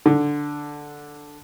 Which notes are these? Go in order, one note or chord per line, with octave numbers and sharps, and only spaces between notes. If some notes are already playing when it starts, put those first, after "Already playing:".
D3